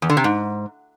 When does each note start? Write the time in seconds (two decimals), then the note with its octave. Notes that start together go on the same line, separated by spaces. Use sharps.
0.02 E2
0.10 D3
0.17 C3
0.24 G#2